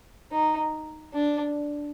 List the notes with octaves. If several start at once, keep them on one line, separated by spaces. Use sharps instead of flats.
D#4
D4